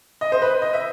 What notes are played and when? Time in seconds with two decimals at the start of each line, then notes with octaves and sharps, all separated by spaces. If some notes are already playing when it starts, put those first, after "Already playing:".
0.21 D#5
0.32 C5
0.42 B4
0.62 D#5
0.73 E5